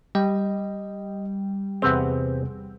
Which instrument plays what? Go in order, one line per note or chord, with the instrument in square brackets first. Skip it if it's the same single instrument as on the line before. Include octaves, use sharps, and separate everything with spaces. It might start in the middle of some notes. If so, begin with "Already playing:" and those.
[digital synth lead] G3 [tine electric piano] D#5
[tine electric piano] E2 C3 G#4 [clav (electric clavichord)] C4 B4 F#5